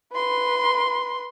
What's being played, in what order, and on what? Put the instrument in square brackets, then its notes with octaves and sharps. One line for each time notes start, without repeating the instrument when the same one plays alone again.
[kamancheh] B4 C6